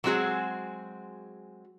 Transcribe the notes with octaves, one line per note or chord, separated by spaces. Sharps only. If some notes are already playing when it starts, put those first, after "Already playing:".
F#3 G#3 C4 F#4 G#4